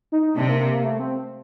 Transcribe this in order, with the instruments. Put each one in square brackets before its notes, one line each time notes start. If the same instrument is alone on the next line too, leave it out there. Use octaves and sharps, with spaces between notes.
[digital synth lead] D#4
[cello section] C3 [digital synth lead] D4
[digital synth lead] A#3
A#3
A#3
A3
C4